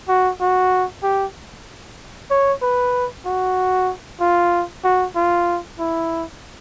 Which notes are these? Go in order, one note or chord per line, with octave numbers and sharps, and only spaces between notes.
F#4
F#4
G4
C#5
B4
F#4
F4
F#4
F4
E4